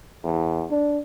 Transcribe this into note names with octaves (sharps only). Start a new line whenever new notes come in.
E2
D4